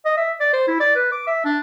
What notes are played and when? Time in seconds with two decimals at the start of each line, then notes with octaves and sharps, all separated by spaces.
0.05 D#5
0.17 E5
0.40 D5
0.53 C5
0.68 E4
0.80 D5
0.96 B4
1.12 D6
1.27 E5
1.45 D4